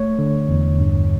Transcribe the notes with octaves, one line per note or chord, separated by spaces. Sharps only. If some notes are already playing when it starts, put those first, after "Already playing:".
Already playing: A3 C#5
D3
E2
G2